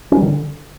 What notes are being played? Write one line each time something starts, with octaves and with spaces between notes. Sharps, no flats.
C#4
G3
D#3
D3